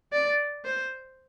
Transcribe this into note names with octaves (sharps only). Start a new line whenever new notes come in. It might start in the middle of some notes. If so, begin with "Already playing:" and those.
D5
C5